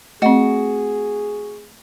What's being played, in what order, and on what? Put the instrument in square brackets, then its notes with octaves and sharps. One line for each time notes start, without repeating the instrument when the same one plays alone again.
[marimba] A3 [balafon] C4 D#5 [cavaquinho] F#4 [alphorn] G#4